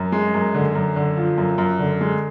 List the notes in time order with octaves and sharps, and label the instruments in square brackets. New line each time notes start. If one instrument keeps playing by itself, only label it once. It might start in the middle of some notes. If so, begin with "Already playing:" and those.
Already playing: [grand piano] F#2
G#3
F#2
D3
F#2
D3
F3
F#2
F#2
D3
G#3